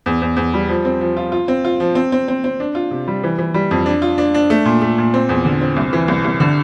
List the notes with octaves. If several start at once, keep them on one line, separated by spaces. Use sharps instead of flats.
E2
E2
E2
G3
F3
C4
F3
F4
F4
C4
F4
F3
C4
C4
C4
C4
D4
F4
C3
G3
E3
E3
G3
F2
D4
F4
D4
D4
A3
A#2
A3
A#2
C4
E2
D3
C4
C2
E3
C2
C2
D3